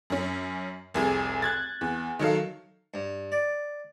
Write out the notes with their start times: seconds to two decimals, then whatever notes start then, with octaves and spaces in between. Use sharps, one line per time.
0.10 F#2 C#4
0.94 F1 C2 G#4
1.42 F#6 G#6 A6
1.81 E2
2.19 D#3 F#3 A4 F5
2.94 G2
3.32 D5